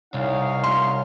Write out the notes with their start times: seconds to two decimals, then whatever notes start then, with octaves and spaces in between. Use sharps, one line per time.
0.14 C2 D#4 C#5 F5
0.64 C6